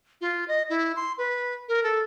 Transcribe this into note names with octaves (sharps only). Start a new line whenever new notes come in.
F4
D#5
E4
C6
B4
A#4
A4